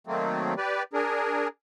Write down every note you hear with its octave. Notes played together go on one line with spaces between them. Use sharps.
D#3 F#3 A3 A#3 C4
G4 B4 D5
D4 G#4 A#4